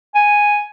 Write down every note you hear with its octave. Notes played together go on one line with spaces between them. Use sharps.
G#5